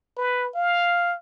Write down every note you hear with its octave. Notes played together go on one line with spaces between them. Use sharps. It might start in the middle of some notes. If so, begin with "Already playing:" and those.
B4
F5